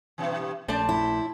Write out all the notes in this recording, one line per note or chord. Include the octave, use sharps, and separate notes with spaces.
G2 B2 E3
A#1 A3 C#4 C5 D5 A5
E4